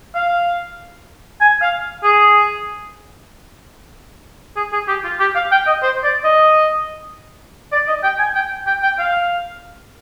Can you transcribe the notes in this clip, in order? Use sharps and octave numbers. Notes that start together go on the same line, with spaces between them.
F5
G#5
F5
G#4
G#4
G#4
G4
F4
G4
F5
G5
D#5
C5
D5
D#5
D5
D#5
G5
G#5
G5
G5
G5
F5